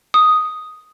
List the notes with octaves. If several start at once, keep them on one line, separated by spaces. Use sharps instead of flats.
D#6